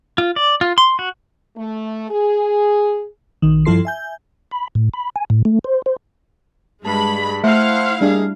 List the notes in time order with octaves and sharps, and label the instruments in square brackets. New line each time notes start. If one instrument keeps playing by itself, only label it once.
[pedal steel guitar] F4
D5
F4
C6
F#4
[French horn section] A3
G#4
[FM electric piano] A#1 D#3
G2 F3 E4 A4 C6 C7
E5 G#5 G6
[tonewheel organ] B5
A2
B5
G#5
A2
A3
C5
C5
[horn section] G2 [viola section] G#3 B5 [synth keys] A5
[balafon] A3 [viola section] E4 F5 [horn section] C5 F#5
[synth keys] G3 D4 [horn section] A#3 D#4 G#4